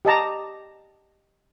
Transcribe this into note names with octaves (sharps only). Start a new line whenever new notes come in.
G4 D#5 A5 A#5